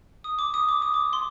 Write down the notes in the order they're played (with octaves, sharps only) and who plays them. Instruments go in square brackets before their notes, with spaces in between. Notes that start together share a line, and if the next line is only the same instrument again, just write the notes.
[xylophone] D#6
D6
D#6
D6
D#6
D6
C6